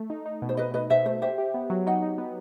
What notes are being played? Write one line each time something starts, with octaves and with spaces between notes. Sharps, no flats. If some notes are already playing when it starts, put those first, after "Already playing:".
Already playing: A3
D#4
D#4
B2
C5
B2 B4 D#5
B2 B4 D#5
B2 C5 E5
A3 C5
G4 C5 E5
G4
B3
F#3
D#4 D#5 F#5
D#4
B3